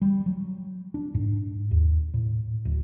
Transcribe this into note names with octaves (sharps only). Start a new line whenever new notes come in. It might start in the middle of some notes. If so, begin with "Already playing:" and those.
G3
F#3
D4
G#2
D#2
A2
D1